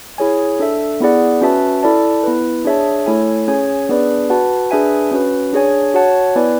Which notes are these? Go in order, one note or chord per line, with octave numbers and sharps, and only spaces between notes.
E4 G#4 C#5 G#5
D4 A4 E5
B3 E4 G#4 D5 F#5
C#4 F#4 B4 E5 A5
E4 A4 D5 A5
B3 E4 B4
D4 G#4 C#5 E5 A5
A3 E4 A4 C#5 G#5
C#4 G#4 C#5 G#5
B3 D4 G#4 B4 D5
F#4 B4 F#5 A5
D4 G#4 B4 E5 G#5
C#4 F#4 B4
D4 G#4 C#5 G#5
F#4 C#5 F#5 A5
B3 E4 B4 D5 G#5